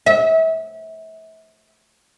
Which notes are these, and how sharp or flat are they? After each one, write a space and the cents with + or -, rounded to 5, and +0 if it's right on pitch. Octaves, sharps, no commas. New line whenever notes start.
E5 -30